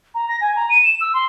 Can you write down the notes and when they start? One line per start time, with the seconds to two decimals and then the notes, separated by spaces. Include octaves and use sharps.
0.15 A#5
0.29 A#6
0.41 G#5
0.56 A#5
0.70 D#7
0.84 E7
1.01 E6
1.14 C6